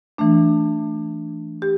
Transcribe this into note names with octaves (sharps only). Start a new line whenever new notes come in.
E3 A3 D4
G4